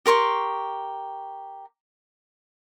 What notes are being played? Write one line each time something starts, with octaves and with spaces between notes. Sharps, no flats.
G4 A#4 C6 C#6